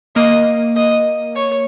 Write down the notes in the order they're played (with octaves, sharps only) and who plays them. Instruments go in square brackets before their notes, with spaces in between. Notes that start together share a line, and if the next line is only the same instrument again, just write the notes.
[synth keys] A#3 [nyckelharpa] D#5
[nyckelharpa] D#5
C#5